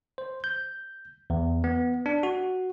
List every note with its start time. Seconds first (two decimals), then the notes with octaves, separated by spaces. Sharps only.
0.18 C5
0.44 G6
1.30 E2
1.64 B3
2.06 D4
2.23 F#4